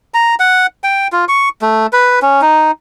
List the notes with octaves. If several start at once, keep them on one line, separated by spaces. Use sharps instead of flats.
A#5
F#5
G5
F4
C#6
A3
B4
C#4
D#4